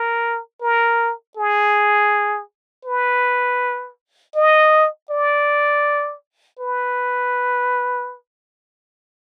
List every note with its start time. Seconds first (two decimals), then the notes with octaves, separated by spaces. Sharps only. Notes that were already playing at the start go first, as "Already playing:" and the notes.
Already playing: A#4
0.61 A#4
1.37 G#4
2.85 B4
4.35 D#5
5.10 D5
6.59 B4